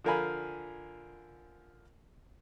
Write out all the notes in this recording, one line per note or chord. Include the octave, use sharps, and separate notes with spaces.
D3 F3 A#4 F5 G#5 B5